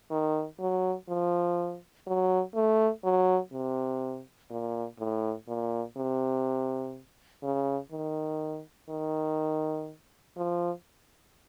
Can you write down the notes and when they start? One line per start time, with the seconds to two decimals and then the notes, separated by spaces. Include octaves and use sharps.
0.11 D#3
0.60 F#3
1.09 F3
2.07 F#3
2.55 A3
3.04 F#3
3.53 C3
4.51 A#2
4.99 A2
5.48 A#2
5.97 C3
7.43 C#3
7.92 D#3
8.90 D#3
10.37 F3